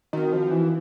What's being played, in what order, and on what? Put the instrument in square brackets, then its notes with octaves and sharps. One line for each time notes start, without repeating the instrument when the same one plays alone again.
[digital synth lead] D#3 [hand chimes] C4 D#4 F#4
[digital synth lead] F3
E3